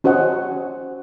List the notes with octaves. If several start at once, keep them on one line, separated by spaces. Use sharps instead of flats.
C#4 F#4 C5 D#5 F#5